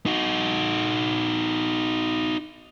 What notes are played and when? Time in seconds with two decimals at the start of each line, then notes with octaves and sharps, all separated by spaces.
0.06 D#4 F#4